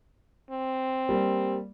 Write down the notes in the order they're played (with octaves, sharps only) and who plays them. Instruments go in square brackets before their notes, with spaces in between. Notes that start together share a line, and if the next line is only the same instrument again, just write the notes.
[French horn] C4
[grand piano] G3 A#3